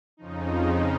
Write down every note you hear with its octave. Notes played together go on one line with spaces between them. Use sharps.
F2 C#3 F3 D#4